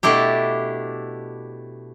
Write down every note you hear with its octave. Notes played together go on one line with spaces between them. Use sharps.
B2 A3 D4 E4 G4